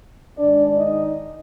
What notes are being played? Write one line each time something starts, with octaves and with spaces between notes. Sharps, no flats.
G#2 D#3 G#3 D4 D5
D#4 D#5